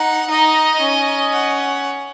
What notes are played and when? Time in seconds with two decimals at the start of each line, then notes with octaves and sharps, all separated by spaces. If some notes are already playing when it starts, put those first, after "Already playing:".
Already playing: D#4 F#5
0.29 D#4 D#5
0.81 C#4
1.32 F#5